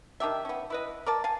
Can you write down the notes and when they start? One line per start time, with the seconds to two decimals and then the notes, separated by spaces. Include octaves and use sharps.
0.20 D#3 D4 G4 E5
0.45 B3 C#4
0.70 E4 B4 D#5
1.06 A#4 D5 A5
1.24 F5 G#5 A5